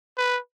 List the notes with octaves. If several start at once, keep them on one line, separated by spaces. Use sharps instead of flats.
B4